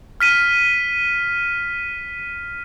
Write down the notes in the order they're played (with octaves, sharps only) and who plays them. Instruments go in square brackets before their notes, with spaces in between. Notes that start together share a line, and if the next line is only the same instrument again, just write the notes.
[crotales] F6 B6 D#7